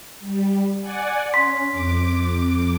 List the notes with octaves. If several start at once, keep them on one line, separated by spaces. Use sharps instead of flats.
G3
D5 F#5 G#5
C#4 C6 B6
F2 D6